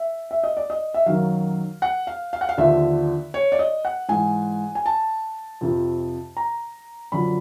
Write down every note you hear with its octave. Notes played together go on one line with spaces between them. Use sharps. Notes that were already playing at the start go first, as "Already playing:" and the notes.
Already playing: E5
E5
D#5
D5
D#5
E5
F#2 D#3 F#3 F5
F#5
F5
F5
F#5
F5
D#2 D3 F3 E5
C#5
D5
D#5
F#5
G#2 E3 G#5
G#5
A5
F2 C3 F3
A#5
F#2 D3 F3 B5